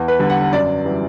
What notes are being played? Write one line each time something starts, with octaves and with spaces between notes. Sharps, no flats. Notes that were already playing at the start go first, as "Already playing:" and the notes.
Already playing: E2
B4
D3 G3
F#5
F#2 D5
E3 G3